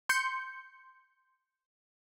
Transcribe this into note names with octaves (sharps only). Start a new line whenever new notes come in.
C6 G6 C#7